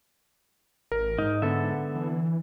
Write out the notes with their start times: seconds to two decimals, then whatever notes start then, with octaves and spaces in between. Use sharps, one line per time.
0.92 A1 A#4
1.19 G#2 D#4
1.42 D3 B3 A4 E5
1.96 E3